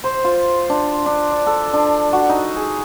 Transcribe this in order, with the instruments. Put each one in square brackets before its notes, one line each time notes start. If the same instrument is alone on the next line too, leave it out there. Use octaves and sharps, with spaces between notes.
[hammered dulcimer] C5
F4
D4
D4
D5
A4
D4
F#4
D#4
G#4